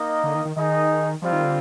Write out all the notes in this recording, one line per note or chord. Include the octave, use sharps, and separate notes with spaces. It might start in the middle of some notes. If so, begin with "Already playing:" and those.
Already playing: A#3 D#4 A#4 D#5
D3
D#3
D#3
D#3 D#4 G#4 D#5
F3 G3 C4 F4
D#3
D3